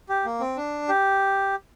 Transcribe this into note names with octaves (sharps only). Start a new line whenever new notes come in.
G4
A#3
C4
D4
G4